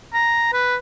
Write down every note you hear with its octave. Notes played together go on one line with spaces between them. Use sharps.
A#5
B4